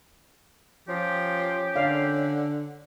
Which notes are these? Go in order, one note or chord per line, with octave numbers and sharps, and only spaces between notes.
F3 C#4 G4
D3 D5 F5